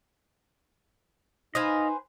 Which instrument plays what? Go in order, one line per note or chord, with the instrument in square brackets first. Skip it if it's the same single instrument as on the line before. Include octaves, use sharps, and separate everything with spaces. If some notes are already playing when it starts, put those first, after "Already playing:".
[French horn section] D#4 [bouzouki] B4 C5 G#5 [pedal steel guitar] D#5 F5